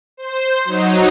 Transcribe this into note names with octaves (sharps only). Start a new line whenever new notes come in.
C5
F#3 D#4